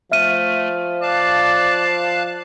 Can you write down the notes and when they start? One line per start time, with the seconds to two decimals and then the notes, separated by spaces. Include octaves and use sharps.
0.12 F3 A3 E5 F6 D#7
1.02 D5 F5 A5 F#6